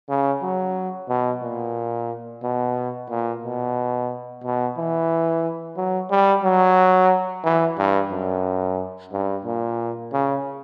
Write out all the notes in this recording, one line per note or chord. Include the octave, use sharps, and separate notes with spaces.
C#3
F#3
B2
A#2
B2
A#2
B2
B2
E3
F#3
G3
F#3
E3
G2
F#2
G2
A#2
C#3